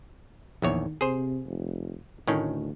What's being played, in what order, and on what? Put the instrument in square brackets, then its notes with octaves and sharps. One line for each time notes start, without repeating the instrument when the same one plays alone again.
[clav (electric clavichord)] A#1 E2 C#5 [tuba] D#3
[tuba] C3 [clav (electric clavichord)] G#4 C5
[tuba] F1
[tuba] D2 [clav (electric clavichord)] A2 D#3 C#4